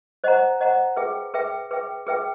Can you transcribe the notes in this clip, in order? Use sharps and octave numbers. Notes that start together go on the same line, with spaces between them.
C5 D#5 F#5 A#5
C5 D#5 F#5 A#5
G#4 B4 E5 G5
G#4 B4 E5 G5
G#4 B4 E5 G5
G#4 B4 E5 G5